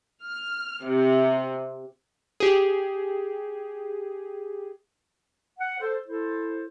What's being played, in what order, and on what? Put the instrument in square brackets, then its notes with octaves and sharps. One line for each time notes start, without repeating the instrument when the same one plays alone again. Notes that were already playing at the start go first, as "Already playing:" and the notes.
[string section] F6
C3
[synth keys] G4 G#4
[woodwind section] F#5
A4 C5
E4 A4 C5